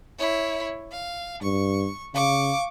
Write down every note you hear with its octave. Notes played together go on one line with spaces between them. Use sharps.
E4 C#5
F5
G2 C#6
C#3 F5 C#6 D6